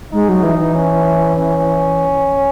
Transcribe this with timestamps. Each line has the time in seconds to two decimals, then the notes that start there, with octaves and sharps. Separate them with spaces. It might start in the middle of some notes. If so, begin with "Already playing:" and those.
0.13 G#3 D#4
0.29 F#3
0.43 E3
0.59 E3
0.75 C#4
1.36 C#4